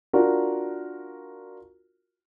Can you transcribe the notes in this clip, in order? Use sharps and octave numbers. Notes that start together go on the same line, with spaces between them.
D4 F4 F#4 A#4